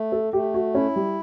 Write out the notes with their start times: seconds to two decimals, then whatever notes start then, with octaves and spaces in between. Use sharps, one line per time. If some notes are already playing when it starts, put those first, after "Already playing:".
Already playing: A3
0.12 A4
0.33 A3 G4
0.54 F#4
0.75 C#4 E4
0.96 G3